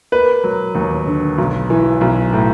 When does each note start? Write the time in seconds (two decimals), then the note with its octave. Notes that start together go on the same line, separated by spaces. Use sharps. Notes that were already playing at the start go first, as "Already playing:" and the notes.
0.12 A#3 B4
0.44 F#3
0.75 D#2
1.07 D3
1.38 B1
1.70 E3
2.01 B1
2.33 A2